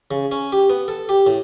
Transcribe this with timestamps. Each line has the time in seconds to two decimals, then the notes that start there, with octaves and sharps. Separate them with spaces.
0.11 C#3
0.32 C#4
0.52 G4
0.70 B3
0.88 A4
1.09 G4
1.27 A2